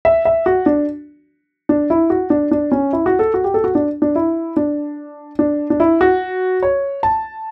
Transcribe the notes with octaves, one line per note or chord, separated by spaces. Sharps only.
E5
E5
F#4
D4
D4
E4
F#4
D4
D4
C#4
E4
F#4
A4
F#4
G4
A4
F#4
D4
D4
E4
D4
D4
D4
E4
F#4
C#5
A5